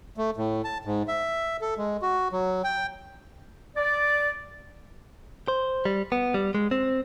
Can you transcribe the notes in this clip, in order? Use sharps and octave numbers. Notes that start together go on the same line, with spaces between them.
A3
A2
A5
G#2
E5
A4
G#3
F#4
F#3
G5
D5
C5
G3
B3
G3
G#3
C4